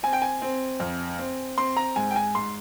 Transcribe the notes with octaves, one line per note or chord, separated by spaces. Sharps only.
C4 G#5
G5
G#5
C4
F2
C4
C4 C6
A#5
G#2 G#5
G5
G#5
G#2 C6